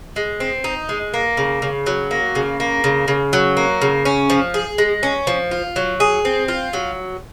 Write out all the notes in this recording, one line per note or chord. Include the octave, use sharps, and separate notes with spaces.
G#3
C4
D#4
G#3
A#3
C#3
C#3
F#3
A#3
C#3
A#3
C#3
C#3
F#3
A#3
C#3
C#4
F3
G#4
G#3
C#4
F3
F4
F#3
G#4
C4
F4
F#3